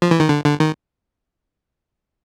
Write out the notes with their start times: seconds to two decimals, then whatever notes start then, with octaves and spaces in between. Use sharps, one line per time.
0.02 F3
0.11 E3
0.20 D#3
0.29 D3
0.44 D3
0.60 D#3